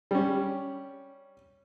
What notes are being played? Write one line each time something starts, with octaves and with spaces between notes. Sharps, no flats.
G3 C#4